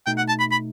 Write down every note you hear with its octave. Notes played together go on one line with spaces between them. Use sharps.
B2 A3 D#4 G5
F#5
A5
B5
B5